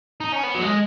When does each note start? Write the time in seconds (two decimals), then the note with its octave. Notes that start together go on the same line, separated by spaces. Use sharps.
0.20 D#4
0.32 C#4
0.43 B3
0.55 F#3
0.62 G#3